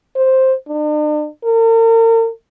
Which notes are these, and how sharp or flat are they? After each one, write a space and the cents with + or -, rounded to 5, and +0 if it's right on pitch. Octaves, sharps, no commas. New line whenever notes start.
C5 +5
D4 +45
A#4 -40